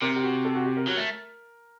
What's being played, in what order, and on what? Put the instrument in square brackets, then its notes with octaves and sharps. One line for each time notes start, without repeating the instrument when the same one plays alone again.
[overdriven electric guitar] C3 [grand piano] A#4
[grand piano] G4
F#4
A4
F#4
G4
A#4
[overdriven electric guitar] F#3
A3